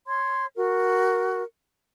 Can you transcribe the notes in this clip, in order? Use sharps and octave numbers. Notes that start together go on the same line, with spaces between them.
C#5 C6 G#6
F#4 A#4